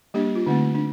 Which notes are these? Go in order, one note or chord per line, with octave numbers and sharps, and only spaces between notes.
G3 A#3 D4 G4
F4
D3 A3 C4 D#4
D4